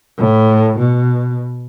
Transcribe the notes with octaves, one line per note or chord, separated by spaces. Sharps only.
A2
B2